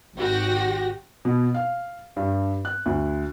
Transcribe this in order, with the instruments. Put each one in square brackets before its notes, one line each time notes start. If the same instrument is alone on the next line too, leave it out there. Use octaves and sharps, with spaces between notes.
[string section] G#1 F#4 G4 A#6
[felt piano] B2
F5
G2
F#6
D2